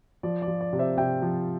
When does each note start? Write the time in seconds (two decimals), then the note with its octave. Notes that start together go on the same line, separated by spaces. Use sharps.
0.23 F3 D5
0.42 D5
0.48 F3
0.61 D5
0.73 C3
0.79 C5 E5
0.97 C3 E5 G5
1.22 F3